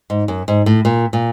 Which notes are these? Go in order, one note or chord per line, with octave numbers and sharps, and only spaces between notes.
G#2
F#2
G#2
A2
A#2
A#2